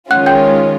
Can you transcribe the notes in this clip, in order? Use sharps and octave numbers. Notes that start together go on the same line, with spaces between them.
D#3 G#3 C#4 F4 F#5 F#6
G5 G6